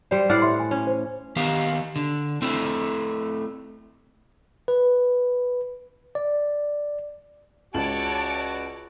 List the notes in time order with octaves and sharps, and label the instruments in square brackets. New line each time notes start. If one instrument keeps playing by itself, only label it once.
[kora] G3 C5 [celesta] D5
[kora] A2 D5 F#5 [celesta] F6 C7
[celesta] E5 C6
G#5
[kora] C#4
[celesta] C5
[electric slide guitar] D#3 B3 G4 F5
D3
A3 C4 E4 A4
[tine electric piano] B4
D5
[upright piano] C#2 F#7 [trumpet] F#4 [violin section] C#5 D5 D7 [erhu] A5